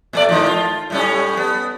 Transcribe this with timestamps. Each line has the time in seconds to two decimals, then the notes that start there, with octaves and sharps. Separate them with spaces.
0.13 A#2 A3 D5
0.29 G#2 D#3 F3
0.47 F4
0.90 A2 G3 C#4
1.37 B3